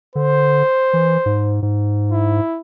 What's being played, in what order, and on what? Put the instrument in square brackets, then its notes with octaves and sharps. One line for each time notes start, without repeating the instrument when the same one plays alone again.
[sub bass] D3 [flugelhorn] C5
[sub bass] E3
G#2
G#2
[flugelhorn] E4